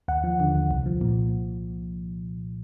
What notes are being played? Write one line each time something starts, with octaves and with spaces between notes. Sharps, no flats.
D#2 F#5
F3
D3
D#2
C2
F3
A#2